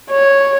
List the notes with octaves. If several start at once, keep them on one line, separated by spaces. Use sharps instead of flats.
C#5